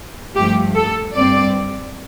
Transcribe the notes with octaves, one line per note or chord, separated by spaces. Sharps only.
G2 F3 A3 G4
A4
G2 G3 C4 D5